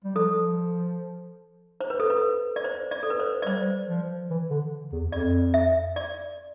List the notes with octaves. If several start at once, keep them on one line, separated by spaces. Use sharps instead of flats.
G3
F3 A4
C5
B4
A4
B4
D5
C5
D5
A4
B4
C5
D5
G3 C5
F3
E3
D3
E2
F2 D5
E5
D5